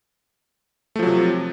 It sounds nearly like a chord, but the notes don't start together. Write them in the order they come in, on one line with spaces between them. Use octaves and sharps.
A3 F3 F#3 C3